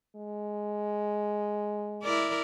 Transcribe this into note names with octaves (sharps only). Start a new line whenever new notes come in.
G#3
E4 A#4 D5